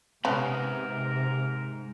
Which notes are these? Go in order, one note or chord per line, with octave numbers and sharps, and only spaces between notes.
G#2 C3 B3 C#4 A#4